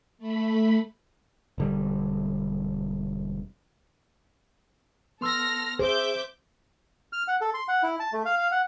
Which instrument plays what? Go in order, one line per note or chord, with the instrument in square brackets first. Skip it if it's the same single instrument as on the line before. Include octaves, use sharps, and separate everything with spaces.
[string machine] A3 B5
[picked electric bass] E1 D3 G3
[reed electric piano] B3 C6 E6 [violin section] A4 F6 A#6
[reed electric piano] G#4 [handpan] C5 [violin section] E5 D6 G6
[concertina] F6
F#5
A4
C6
F#5
E4
A5
A3
F5
F5
F#5